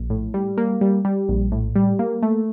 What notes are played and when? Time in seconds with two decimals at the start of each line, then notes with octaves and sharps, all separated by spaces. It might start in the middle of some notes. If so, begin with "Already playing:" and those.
Already playing: A#1
0.10 A2
0.34 G3
0.57 A#3
0.81 G3
1.05 G3
1.29 A#1
1.52 A2
1.76 G3
1.99 A#3
2.23 A3